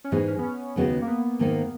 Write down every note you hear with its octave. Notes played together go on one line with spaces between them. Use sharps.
C#4
G#2 E3 G#3 B3 D#4 G#4
C#4
B3
C#4
D#2 C#3 G#3 B3 F#4
A#3
B3
G#2 D#3 A#3 D#4